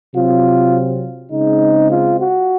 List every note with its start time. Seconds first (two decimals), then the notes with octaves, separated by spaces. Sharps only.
0.15 C3 F#3 C4 F4
1.31 C#3 G#3 C4 D#4
1.90 F4
2.19 F#4